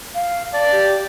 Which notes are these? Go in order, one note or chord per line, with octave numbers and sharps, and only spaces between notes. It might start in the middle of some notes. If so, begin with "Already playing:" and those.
F5
D5 A5
G4